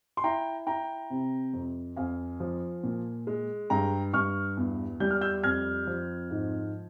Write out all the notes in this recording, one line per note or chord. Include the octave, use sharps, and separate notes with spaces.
C6
E4 G5 A#5
E4 G5 A#5
C3
F2
F2 F5 G#5
F3
A#2
G#3
G2 G5 A#5
G2 C#6 F6
E2
G3 G6
F6
E6 G6
F2 F6 G#6
F3
G#2